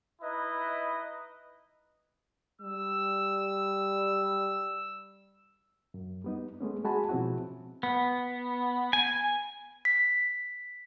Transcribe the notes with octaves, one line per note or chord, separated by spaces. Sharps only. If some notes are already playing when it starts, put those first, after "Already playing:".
D#4 E4 B4 D#5
G3 E6
F#2
G3 B3 D#4
G#3 A3 B3 C#4
G#3 F#4 G#4 G#5 A5 B5
B2 F3 C4 C#4 E4 F#4
B3
G#5
B6